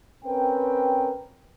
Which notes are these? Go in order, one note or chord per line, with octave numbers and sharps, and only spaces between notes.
C4 C#4 A#4 B4 G5